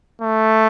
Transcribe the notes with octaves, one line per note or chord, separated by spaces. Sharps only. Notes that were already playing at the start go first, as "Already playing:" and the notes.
A3